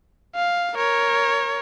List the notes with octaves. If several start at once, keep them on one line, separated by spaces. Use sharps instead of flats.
F5
A#4 C#5